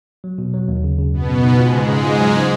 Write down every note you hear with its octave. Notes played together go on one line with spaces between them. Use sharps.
F#3
B2
F#3
D#2
C#3
C#3
F#2 B2 B3
F#2
D#4
G#2 G#3 F4
C#3
C#3
F4
F#3
C#3